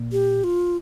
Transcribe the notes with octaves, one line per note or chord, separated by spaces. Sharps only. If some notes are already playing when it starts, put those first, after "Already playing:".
Already playing: A#2
G4
F4